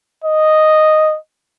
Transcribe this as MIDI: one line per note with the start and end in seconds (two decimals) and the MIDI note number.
0.24 1.17 75